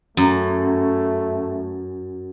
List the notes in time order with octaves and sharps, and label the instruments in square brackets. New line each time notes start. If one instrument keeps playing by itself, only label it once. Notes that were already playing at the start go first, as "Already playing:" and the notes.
[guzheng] F#2 [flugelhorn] A3